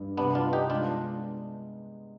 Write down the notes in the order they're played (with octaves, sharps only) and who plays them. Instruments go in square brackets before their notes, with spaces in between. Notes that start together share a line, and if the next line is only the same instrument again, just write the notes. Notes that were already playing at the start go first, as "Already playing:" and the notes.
Already playing: [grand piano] G2
[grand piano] C3 [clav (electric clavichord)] B3 D4
[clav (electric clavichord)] D4 F4
[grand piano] B3
[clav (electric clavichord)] D#4 G4
[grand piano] G#3 [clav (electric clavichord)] D4 F4